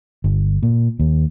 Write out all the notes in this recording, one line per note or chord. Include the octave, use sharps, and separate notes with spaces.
G1
A#2
D#2